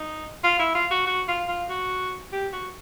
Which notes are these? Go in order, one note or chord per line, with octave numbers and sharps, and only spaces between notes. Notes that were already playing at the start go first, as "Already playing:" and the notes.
Already playing: D#4
F4
E4
F4
F#4
F#4
F4
F4
F#4
G4
F#4